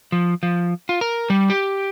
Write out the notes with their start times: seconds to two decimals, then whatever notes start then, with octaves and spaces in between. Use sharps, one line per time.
0.12 F3
0.43 F3
0.89 F4
1.01 A#4
1.30 G3
1.50 G4